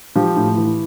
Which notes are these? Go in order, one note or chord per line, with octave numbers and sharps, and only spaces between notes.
F3 G4
A2
E3